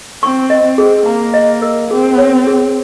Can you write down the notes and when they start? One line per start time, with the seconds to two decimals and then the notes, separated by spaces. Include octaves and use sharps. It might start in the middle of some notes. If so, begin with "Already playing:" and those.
0.22 C4 C#6
0.50 D#5
0.65 C4
0.78 G#4
1.06 A#3 A#5
1.34 D#5
1.62 A#4
1.91 C4 G#4
2.18 C#5
2.47 G#4